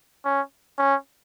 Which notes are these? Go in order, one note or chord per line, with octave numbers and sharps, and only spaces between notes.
C#4
C#4